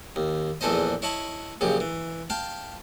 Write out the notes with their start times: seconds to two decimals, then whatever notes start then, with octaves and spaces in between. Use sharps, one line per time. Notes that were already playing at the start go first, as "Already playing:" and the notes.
0.16 D#2
0.61 A#1 E2 E3 A4 C5 D#5
1.02 E4 C#5 D#5 A5 B5
1.61 A#1 F#2 C#3 G4
1.80 E3
2.30 F5 G5 A5